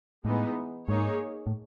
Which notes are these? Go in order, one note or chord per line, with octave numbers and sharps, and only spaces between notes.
A2 E3 G#3 B3 D#4
G#2 A#3 D#4 G#4 C#5
A2